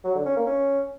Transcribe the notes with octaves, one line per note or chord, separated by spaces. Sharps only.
F#3
D3
C#4
A#3
C#4